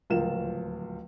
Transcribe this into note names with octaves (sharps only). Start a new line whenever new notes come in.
D1 C#2 F3 F4 A#4 E7